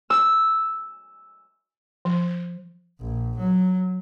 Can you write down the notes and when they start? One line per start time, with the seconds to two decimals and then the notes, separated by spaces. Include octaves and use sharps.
0.10 E6
2.05 F3
3.01 A#1
3.38 F#3